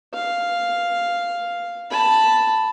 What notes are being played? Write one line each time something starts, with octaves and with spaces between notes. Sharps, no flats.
F5
A5 B5